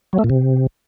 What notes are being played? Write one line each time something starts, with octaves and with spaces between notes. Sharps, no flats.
F#3
A3
A#2
C3